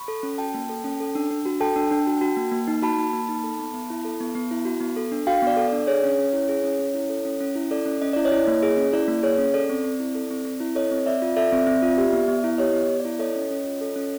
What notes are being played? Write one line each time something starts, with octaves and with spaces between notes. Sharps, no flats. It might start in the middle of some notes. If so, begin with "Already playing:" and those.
Already playing: B5 C#6
A4
C#4
F#4 G5 A5
A#3
A4
C#4
A4
D4
D4
F#4
A4 G5 A5
D4
D4
F#4
F#4
A#3
A#3
D#4
F#4 A5 B5
A#3
A#3
D#4
A4
B3
B3
E4
A4
B3
B3
E4
F#4
B3
A4
D4
F#4 F5 G5
B3
D5
A4
D4 D5
G#4 C#5
C#4
C#4
E4
G#4
C#4
C#4
E4
A4
C#4
C#4
E4
A4 D5
C#4
C#4 D#5
E4 D5
C#5 D#5
E4
A#3
G#4
C#4
E4 D5
A#3
G#4 C#5
C#4
A4 D5
C4
C4
E4
A4
C4
C4
E4
A4 C#5 D#5
C4
C4 D5 E5
F4
A4 D5 E5
C4
C4
F4
G4
B3
B3
E4
G4 C#5 D#5
B3
B3
D5
E4
A4 C#5 D#5
C#4
C#4
F4
A4
C#4